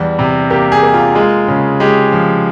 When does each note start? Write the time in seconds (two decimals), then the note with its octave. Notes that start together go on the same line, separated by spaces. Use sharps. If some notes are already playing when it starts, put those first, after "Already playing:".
Already playing: E2 G3
0.19 C3
0.50 A#3 G4
0.72 G#4
0.83 A#3
0.94 F4
1.15 G#3 F4
1.48 C#3
1.80 G#3 G4
2.12 F3